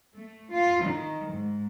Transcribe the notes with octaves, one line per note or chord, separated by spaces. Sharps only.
A3
F4
D#3
G#2